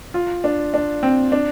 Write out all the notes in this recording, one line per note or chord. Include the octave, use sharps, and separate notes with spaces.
F4
D4
D4
C4
D4